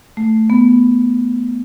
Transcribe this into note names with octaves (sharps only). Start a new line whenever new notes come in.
A3
B3